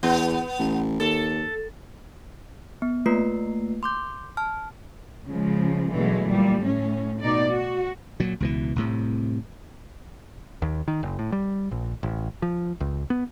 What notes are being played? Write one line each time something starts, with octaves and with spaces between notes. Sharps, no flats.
E2 B3
A1
D#2 A4
B3
A3 A#3 F4 B4 C7
C6 D6 G6
A5 F6
C#3 F3 G#3
B2 D3 E3 F#3 G#3 A3
A#2 G3
A2 C#4
B2 D#4 D5
F#4
A#2 F#3
C#2 B2 E3
C2 A2 C3
D#2
D#3
F#1
A2
G3
A#1
A1
F3
C#2
B3